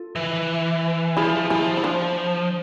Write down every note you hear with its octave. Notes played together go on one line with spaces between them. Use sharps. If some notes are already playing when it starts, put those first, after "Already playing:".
Already playing: F4 A4
E3
F3 E4 G#4
F3 E4 G#4
E4
D4 F4